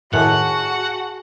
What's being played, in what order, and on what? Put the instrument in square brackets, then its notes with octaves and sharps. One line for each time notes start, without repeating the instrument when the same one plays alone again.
[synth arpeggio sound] A2 D#3 [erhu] F#4 [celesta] G#4 G#5 A5 [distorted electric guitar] F#5